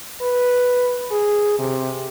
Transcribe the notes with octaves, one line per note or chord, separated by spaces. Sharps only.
B4
G#4
C3